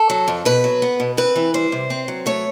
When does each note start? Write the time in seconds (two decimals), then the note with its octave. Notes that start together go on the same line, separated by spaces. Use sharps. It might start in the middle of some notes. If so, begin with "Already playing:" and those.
Already playing: A4
0.10 F#3
0.28 F2
0.45 B2 B4
0.64 F#3
0.82 B3
1.00 B2
1.17 C4 B4
1.36 E3
1.54 G3 C5
1.72 C3
1.90 C4
2.08 F#3
2.26 A3 C#5